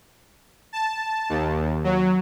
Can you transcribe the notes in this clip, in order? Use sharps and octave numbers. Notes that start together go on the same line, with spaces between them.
A5
D#2
F#3